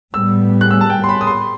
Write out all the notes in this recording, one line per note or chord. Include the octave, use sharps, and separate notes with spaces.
A2 G3 B3 E6
F#6
E6
A5
G5
C6
B5
D#6
C6